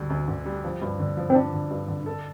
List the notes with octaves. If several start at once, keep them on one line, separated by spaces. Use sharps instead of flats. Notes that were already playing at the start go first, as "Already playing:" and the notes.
Already playing: D2 D3 G3
D2
D3
G3
F3
G2
D3
F3
C4
F3 D4
D3
G2
D3
A4